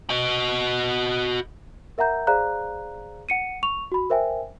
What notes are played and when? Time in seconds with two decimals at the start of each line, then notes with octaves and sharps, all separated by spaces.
0.10 F#4 D#5
1.98 A#4 E5 F#5 A#5 G6
2.27 G#4 C5 D5 F5 A#5 F#6
3.29 F#5 C#7 D#7
3.63 C#6 F7
3.92 F#4 B5
4.10 A#4 C5 E5 G5 G#5